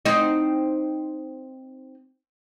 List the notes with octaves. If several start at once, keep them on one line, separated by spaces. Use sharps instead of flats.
C4 D#4